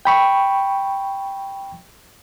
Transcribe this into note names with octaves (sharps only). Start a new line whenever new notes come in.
G5 B5 C#6